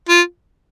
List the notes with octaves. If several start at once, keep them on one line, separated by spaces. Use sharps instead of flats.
F4